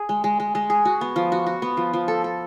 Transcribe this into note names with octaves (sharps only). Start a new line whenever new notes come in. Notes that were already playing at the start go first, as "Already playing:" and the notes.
Already playing: G#4
G#3
G#3
G#3
G#3
G#4
F#4
B3
F3
F#4
F#4
B3
F3
F3
A4
A4